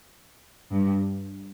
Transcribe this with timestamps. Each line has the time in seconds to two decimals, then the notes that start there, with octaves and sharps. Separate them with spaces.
0.71 G2